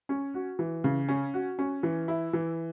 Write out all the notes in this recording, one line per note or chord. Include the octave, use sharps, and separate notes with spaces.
C#4
F#4
E3
C#3
C#4
F#4
C#4
E3
E4
E3